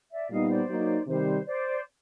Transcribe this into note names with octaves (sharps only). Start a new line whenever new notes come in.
D5 E5
A#2 G3 B3 D#4 D#5 F5
C5 D5
F#3 A#3 D#4
C3 D#3 G3 C5
C5 D5